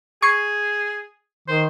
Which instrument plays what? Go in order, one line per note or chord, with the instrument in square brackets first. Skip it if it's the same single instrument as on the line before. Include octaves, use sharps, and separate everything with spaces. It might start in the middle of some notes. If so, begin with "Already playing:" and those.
[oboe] G#4 [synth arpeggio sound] C#6 G#6 C7
[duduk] D#3 [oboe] C5